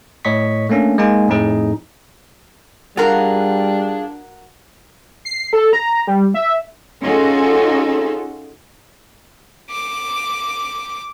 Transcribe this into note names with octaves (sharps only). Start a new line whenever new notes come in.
A2 C#5 D#5 C#6 B6
A3 A#3 C#4 D4
G#3 A#3 D#4 G#5
F2 A2 D#4 G#4
G3 D4 F4 F#4 G#4 A#4 F5
C7
A4
A#5
G3
E5
C#4 D#4 F4 F#4 G#4 A4
D6